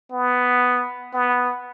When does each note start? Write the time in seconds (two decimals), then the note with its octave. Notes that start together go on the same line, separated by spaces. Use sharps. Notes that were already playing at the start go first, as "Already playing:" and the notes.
0.12 B3
1.13 B3